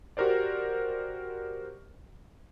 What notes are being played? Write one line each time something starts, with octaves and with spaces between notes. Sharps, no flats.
F#4 G4 A#4 C5 D5